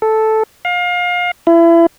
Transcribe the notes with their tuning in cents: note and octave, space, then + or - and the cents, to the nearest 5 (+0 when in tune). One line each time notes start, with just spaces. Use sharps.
A4 -5
F5 +30
E4 +30